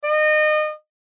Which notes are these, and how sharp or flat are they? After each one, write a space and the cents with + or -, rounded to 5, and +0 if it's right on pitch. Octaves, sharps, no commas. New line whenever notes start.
D#5 -30